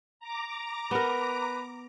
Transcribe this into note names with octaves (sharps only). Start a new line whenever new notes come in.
A#5 D6
B3 A#4 B4